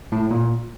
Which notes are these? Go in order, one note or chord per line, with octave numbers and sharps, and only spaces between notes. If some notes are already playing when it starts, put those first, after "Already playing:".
A2
A#2